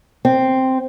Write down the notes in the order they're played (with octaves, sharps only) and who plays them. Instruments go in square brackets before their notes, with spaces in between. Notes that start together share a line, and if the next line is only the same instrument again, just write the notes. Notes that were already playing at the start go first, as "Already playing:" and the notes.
[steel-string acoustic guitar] C4